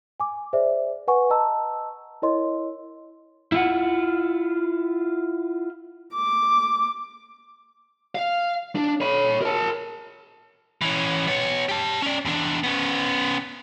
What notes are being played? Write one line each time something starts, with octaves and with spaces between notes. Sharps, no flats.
G#5 D6
G#4 C5 D5 E5
B4 F#5 G#5 C#6
D#5 A5 A#5 E6
E4 A#4 C#5 D#5 C6
E4 F4 F#5
D6
F5
D4
C#5 B5
A#4 A5
E3 C#4
B3 C#5
G4 A5
C#4 D5
E2 D4
B3 C#4